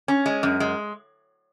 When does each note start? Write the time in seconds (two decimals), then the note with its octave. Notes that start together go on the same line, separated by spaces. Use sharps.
0.08 C#4
0.26 G#3
0.43 F#2
0.60 G#3